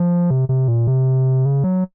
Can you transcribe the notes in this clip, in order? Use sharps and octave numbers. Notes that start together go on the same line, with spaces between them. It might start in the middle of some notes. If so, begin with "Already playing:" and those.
Already playing: F3
C3
C3
A#2
C3
C#3
F#3